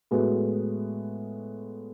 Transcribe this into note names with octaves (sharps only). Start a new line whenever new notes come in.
A2 G#3 B3 F#4